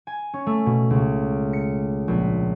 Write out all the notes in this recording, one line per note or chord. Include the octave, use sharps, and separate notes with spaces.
G#5
C#4
A3
B2
C#2
C#7
A#1